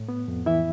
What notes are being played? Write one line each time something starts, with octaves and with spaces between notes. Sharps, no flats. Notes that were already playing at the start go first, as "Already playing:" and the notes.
Already playing: A2
B3
F2
E3 E4 E5